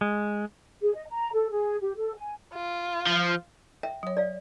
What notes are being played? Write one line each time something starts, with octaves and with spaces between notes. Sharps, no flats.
G#3
G#4
D#5
A#5
A4
G#4
G4
A4
G#5
F4
F3
E5 G5
F#3 C#5
D5 F5